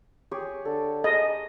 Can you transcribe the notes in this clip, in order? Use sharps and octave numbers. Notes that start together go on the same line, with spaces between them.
G4 G#4 C#5
D3 A4
G#4 D#5